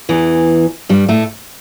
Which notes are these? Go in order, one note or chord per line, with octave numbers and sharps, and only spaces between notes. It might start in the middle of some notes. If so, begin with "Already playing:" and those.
E2 E3
G2 G3
A2 A3